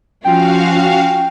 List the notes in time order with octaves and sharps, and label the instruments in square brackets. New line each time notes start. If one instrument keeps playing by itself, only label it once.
[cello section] F3 F4 [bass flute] C#4 [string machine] F#4 F5 [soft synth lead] G5